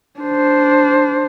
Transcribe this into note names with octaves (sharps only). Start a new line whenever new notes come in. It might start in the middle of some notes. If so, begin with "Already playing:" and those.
D4 C5